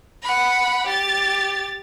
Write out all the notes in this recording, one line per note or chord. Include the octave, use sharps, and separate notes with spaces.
F#5 B5
G4 A6